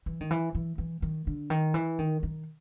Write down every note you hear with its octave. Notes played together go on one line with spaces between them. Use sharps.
E3
D#3
E3
E3
E3
D#3
D3
D#3
E3
D#3
D#3